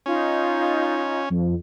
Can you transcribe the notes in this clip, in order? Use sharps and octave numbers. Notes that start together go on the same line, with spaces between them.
C#4 D#4 F4
F2